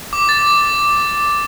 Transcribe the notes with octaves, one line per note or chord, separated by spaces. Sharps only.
D6
A6